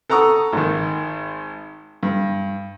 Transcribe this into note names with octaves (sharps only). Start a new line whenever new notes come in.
A4 F#5 A#5 C#6 D#6
G#1 D#3
G2